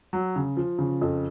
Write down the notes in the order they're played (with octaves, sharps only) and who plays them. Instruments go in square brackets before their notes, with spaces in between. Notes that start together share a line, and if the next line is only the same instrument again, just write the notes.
[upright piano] F#3
C#3
F3
C#3
F2